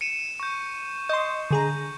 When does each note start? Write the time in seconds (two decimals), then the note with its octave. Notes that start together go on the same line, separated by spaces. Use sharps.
0.01 C#7 D#7 E7
0.40 C#6 G6
1.09 D#5 C6 G6
1.51 D3 G#4 A#5